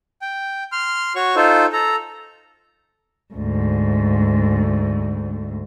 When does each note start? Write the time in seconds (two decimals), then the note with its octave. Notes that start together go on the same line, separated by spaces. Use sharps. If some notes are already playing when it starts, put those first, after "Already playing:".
0.22 G5
0.72 C6 F6
1.16 F#4 C#5 C#6
1.36 D#4 F4 A4 C5
1.73 A4 A#5
3.34 D2 G#2